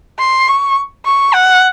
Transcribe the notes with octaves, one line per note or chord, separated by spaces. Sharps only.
C6
C#6
C#6
F#5